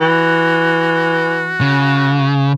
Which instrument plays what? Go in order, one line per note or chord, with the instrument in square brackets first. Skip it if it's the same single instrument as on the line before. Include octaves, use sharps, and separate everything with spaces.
[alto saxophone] E3 [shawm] F#4
[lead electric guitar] C#3